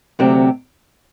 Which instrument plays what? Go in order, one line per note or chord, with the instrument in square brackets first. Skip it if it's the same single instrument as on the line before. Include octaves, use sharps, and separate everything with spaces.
[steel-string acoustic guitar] D2 C3 F#3 C4 G4